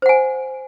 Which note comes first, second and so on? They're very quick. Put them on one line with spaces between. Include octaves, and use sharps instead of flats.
C5 F#5 G#5